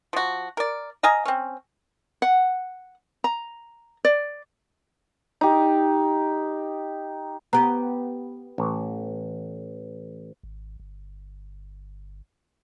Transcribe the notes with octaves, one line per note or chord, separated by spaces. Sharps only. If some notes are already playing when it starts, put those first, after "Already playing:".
F3 F#4
A#4 D5
D#5 F5 G#5 A#5
C4 C#4
F#5
A#5
D5
D#4 G4
B3 G4 A#5
A1
G#1
G1